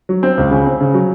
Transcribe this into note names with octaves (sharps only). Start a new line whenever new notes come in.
F#3
C4
C#2
C#3
C4
C#3
F#3